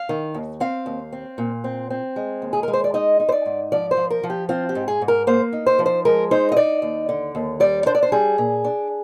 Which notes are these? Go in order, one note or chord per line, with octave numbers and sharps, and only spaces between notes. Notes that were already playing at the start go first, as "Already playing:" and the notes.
Already playing: F5
D#3
D#2
C4 F5
D#2
C4
A#2
C4
C4
G#3
D#2
G#4
G#3 A#4
C5
D5
D#4 D#5
D#4
C5
D5
G#2
F3 D5
C5
F3
A#4
F3
G4
C4 F4
G4
G#2
G#4
G#2
A#4
A#3 C5
D#4
C5
F3
C5
G#3 A#4
D#4 C5
D#5
D#4 D5
D#2
D3
D#2
G3 D5
D4 C5
D5
C5
G3 G#4
A#2
D4